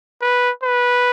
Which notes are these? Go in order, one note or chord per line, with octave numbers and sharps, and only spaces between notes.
B4
B4